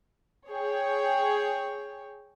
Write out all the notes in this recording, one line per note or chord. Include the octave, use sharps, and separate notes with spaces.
G#4 C#5 G5